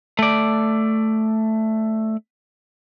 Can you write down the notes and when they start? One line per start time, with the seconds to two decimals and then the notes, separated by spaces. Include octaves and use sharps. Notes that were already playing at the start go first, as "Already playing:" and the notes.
0.19 A3 D5